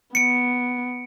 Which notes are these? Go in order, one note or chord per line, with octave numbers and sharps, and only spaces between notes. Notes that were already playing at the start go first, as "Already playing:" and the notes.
B3 C#7 D7